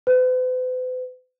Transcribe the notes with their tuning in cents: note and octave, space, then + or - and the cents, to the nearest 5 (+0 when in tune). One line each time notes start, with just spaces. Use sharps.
B4 +45